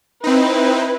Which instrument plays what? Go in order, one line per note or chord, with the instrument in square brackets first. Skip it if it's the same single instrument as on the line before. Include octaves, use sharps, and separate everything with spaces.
[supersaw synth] C4 D#4 [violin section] E4 B4